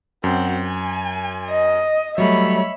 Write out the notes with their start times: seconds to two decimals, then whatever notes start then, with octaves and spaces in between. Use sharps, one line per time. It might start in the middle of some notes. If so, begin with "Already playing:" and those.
0.24 F#2 C4 F#4
0.65 G#5
1.50 D#5
2.18 F#3 G3 A3 C#5 E5 B5